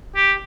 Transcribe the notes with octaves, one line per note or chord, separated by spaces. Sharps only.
G4